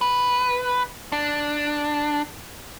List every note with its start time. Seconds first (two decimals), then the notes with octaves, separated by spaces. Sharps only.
0.01 B4
1.12 D4